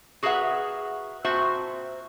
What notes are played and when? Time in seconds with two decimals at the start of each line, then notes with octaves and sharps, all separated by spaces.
0.23 F#4 G#4 A#4 B4 E5 F#5
1.25 A#2 C4 F#4 C5 E5 A5